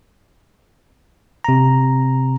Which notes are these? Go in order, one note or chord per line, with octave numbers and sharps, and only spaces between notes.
C3 A#5